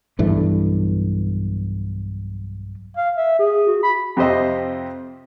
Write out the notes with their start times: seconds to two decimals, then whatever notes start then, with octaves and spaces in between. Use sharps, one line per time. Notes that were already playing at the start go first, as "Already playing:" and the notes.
0.19 B1 G2 E3 A3
2.97 F5
3.17 E5
3.39 G#4
3.67 F#4
3.83 B5
4.17 F2 C3 G4 C5 D#5 E5